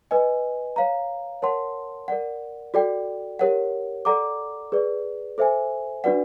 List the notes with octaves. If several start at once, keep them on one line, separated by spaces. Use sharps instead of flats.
B4 D#5 G#5
C#5 F5 A#5
A#4 C#5 F#5 A5 C6
A#4 D5 F#5
F#4 A4 D5 G5
G4 A#4 C#5 F#5
A4 D5 F#5 A#5 D6
G#4 B4 D5
A4 C5 E5 G#5
D4 F#4 B4 D5 F#5